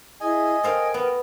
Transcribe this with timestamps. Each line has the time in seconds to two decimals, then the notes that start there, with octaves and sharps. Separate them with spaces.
0.21 E4 G#4 D#5 G#5
0.63 A4 A#4 C5 F5 G5
0.94 B3